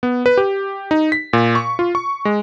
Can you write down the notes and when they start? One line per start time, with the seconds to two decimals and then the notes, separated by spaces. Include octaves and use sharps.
0.03 B3
0.26 B4
0.37 G4
0.91 D#4
1.12 B6
1.33 A#2
1.55 C#6
1.79 F4
1.95 C#6
2.25 G#3